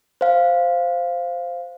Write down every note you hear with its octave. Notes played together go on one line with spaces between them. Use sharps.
C5 F5